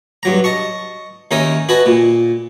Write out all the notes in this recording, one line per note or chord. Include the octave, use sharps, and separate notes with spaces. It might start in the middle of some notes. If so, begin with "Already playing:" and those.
G2 F#3 A#5
D#5 A5 C#6
D#2 C#4 D#4 A#4 E5 G#5
F#4 B4 D#5 G#5 A5
A#2